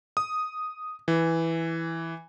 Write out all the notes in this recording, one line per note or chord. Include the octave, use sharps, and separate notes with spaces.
D#6
E3